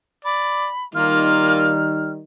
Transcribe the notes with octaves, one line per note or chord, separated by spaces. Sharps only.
D5 B5
D#3 G3 A#3 D#4 F4 F6